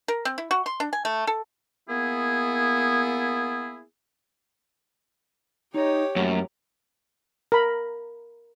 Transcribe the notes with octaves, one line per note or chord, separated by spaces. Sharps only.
A#4
C4
E4
F#4
C6
D4
G#5
A3
A4
A#3 B3 E4 G#4
D#4 G4 C#5 D#5
F#2 A3 A#3 C#4
A#4 B5